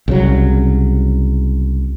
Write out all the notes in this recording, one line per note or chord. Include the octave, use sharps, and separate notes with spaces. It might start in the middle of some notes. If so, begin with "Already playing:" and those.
C2 C#3 F#3